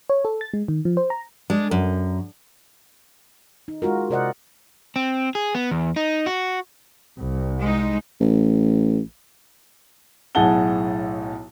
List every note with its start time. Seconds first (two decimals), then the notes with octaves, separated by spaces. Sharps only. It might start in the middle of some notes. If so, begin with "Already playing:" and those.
0.10 C#5
0.25 A4
0.41 A6
0.54 G#3
0.68 D#3
0.85 F3
0.97 C5
1.10 A#5
1.50 G#3 D4
1.71 F#2
3.68 D#4
3.82 G#3 F4 F#4 A#4
4.10 C3 A#4 C5 D5 D#5 F#5
4.96 C4
5.35 G#4
5.55 B3
5.71 E2
5.96 D#4
6.26 F#4
7.18 C2
7.61 G#3 D#4
8.20 A1
10.35 B1 A2 G#4 F#5 A5 G7